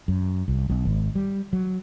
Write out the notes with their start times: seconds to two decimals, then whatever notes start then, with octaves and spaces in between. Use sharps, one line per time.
0.08 F#2
0.48 C2
0.70 B1
0.85 G#1
1.15 G3
1.53 F#3